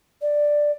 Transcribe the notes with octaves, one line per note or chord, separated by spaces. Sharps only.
D5